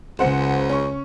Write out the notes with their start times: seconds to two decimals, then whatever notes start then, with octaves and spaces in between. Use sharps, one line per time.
0.19 C#2 C#3 C5 F#5
0.69 C#4 C#6